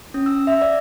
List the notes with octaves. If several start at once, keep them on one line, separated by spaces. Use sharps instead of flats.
C#4
E6
E5
D5